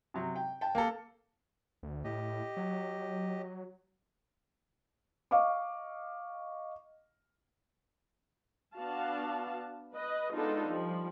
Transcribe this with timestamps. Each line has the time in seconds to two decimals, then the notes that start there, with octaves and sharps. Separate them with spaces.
0.14 C3 F#3
0.36 G5
0.61 G5 A5
0.75 A#3 A4
1.83 D2
2.04 A2 G4 D#5
2.57 F#3
5.31 D#5 F5 C#6 D6
8.75 B3 D4 F#4 F5 A5
9.93 B4 D#5
10.32 G#3 B3 D4 D#4 F4 A4
10.68 F3 G3